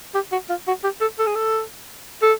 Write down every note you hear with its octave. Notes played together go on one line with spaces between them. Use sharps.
G4
F#4
F4
F#4
G4
A4
A4
G#4
A4
A4